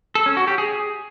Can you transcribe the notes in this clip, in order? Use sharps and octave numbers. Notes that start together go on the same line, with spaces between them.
A4
C#4
F#4
G4
G#4